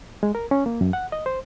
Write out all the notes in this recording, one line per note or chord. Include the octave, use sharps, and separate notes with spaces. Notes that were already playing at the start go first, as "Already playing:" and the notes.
G#3
A#4
C#4
A#3
F#2
F#5
D#5
C5